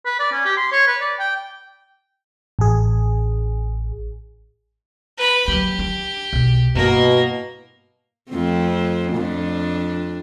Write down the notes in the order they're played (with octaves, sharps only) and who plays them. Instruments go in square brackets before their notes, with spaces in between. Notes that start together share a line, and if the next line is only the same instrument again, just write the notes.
[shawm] B4
D5
C#4
G4
C6
C#5
B4
D5
G5
[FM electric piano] A1 G#4
[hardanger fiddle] B4 B5
[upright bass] F#3 A#3 [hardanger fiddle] G4
[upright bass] D4
B1 B2
[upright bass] G2 E4 [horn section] B2 [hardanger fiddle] A#3 A#4
[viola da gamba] F2 A3 C4
F2 D4